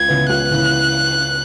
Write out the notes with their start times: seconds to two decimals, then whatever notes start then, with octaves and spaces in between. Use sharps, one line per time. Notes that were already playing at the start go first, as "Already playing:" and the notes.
Already playing: C#2 G#6
0.08 C#3 E3 B3 E4
0.29 C#2 F#6
0.51 C#3 E3 B3 E4